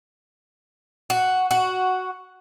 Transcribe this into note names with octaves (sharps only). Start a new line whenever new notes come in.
F#4
F#4